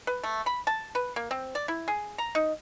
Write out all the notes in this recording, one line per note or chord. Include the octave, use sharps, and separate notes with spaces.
B4
A3
B5
A5
B4
A#3
C4
D5
E4
G#4
A#5
D#4